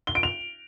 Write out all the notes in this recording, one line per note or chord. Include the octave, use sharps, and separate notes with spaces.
G7
D7
F7